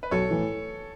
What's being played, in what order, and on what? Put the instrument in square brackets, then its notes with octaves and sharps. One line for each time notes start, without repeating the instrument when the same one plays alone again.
[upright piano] B4
[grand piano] B1 [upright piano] A4 C#5
[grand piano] A2 E3